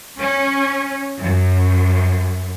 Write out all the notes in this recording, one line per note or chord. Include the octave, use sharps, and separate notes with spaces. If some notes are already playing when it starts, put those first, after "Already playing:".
C#4
F#2